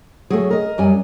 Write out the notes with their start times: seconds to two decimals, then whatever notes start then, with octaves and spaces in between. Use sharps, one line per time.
0.30 F#3 A3 G#4
0.51 A#4 D#5
0.78 F#2 G3 G#5